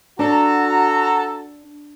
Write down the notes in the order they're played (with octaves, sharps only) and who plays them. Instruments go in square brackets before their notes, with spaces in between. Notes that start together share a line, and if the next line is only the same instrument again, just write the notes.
[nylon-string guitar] D4 [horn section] F#4 A4 A#5